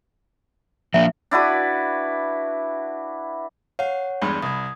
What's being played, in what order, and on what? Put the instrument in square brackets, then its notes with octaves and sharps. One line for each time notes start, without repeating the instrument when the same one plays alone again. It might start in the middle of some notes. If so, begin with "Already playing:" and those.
[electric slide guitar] F3 A#3 D4 [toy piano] E5
[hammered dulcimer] D4 E4 F#4 B4
[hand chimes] C#5 F#5 [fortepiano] F5
[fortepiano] E2 G2 G#3 [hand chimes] B5
[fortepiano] C2 [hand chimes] D#6 G#6